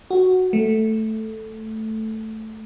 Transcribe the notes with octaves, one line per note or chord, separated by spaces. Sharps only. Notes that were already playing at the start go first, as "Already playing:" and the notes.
F#4
A3